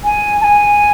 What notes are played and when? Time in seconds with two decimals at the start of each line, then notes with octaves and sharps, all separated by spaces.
0.04 G#5
0.41 A5
0.44 G#5